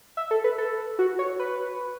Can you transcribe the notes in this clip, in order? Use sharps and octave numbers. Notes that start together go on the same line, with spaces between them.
E5
A4
B4
A4
F#4
C#5
B4